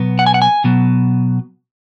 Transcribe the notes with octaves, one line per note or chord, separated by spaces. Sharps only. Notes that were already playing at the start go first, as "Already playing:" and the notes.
Already playing: B2 F#3 B3
F#5
G#5
F#5
G#5
B2 F#3 B3